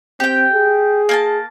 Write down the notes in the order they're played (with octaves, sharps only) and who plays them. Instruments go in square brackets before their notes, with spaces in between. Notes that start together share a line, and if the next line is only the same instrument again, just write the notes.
[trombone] C4 [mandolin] G4 G5
[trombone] G#4
[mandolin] A#3 G#5 A5